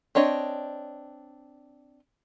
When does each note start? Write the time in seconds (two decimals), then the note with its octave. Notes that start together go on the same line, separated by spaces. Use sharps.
0.15 C4 D4 C#5 D#5